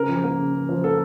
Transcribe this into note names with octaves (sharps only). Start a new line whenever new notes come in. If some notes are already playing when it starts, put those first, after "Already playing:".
Already playing: C#3 A#4
F3
A#3
C#3
C#3
F3
A#3 A4